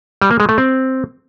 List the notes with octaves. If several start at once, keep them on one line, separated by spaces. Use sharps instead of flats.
G3
A#3
G#3
A3
C4